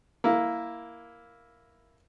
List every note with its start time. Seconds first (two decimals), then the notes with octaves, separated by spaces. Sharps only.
0.24 A#3 E4